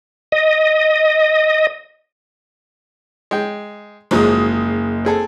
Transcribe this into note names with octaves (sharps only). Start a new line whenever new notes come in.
D#5
G#3 G5
F#1 G#2 F3 F#3 G#3 D#6
C4 G#4 A4